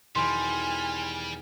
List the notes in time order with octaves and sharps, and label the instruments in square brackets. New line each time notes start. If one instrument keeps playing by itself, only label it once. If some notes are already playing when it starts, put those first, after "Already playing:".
[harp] E2 B2 D#3 [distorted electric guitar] G3 [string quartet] G#5 F6 [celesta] C6